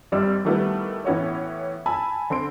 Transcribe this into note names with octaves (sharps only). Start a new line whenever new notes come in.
G#1 G3 D5 E6
D#3 G3 A3 B3 E4 B4
A2 E3 B3 C#4 F#4 C#5
G#5 A5 B5 E6
D3 C4 C6 D7